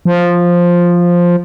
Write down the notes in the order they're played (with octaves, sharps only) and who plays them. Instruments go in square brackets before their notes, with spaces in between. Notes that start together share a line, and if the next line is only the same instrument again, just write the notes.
[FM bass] F3